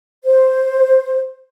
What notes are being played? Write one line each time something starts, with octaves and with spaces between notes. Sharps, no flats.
C5